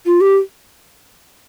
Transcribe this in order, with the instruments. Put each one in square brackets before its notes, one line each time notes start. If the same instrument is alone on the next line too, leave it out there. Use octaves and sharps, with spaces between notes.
[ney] F4
G4